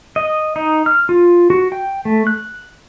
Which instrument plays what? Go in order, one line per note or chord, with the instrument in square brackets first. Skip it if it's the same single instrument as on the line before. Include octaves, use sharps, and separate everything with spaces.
[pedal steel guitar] D#5
D#4
F6
F4
F#4
G5
A3
F#6